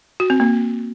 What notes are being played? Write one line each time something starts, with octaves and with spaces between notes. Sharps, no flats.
F#4
C4
A#3